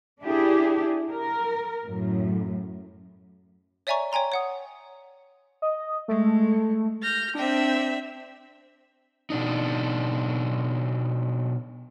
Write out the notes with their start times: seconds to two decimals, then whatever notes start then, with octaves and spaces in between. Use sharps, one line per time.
0.22 D4 E4 G4 G#4
1.12 A#4
1.85 F#2 A2
3.87 C#5 D5 E5 G#5 A#5 C#6
4.12 C#5 G5 G#5 A#5 C6
4.32 C#5 F#5 D#6
5.62 D#5
6.08 G#3 A3
7.02 F6 G6 A#6
7.35 C4 D4 E5 G5
9.30 B2 D4 D#4